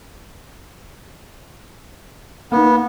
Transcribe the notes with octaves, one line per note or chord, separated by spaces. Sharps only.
A#3 B3 D#4